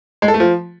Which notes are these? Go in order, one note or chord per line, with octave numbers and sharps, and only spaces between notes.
G#3
A4
A3
F3